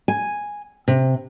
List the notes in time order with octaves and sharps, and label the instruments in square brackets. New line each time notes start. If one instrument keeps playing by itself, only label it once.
[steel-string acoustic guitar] G#5
C3